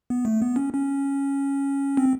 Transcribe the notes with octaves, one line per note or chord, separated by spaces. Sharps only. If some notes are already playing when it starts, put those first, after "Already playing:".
B3
A3
B3
C#4
C#4
C4